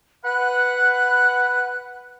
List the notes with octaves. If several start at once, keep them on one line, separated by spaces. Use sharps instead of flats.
B4 F#5 F#6